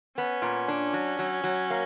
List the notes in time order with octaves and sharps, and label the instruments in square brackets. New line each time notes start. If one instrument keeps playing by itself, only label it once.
[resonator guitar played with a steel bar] B3 [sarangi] C#4
[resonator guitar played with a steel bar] A#2
D4
F#3
F#3
F#3
A#3